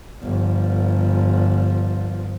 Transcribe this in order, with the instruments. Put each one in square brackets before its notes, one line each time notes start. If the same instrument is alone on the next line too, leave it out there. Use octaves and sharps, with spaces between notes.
[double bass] G1 F3